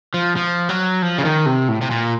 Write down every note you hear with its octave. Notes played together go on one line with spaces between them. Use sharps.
F3
F3
F#3
F3
C#3
D#3
C3
A2
C3
A#2